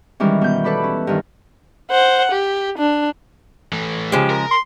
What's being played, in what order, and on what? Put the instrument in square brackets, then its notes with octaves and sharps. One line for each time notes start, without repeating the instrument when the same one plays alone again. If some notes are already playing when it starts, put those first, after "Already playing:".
[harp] D#3 E3 G3 G#3 C#4
B2 G6
A4 B4 D5 B5
C#4
G2 D#3
[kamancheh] C5 F#5
G4
D4
[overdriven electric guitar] E3 A3
[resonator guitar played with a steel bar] C#3 F3 G#3 [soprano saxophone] G4
[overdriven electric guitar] A#4
[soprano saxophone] C6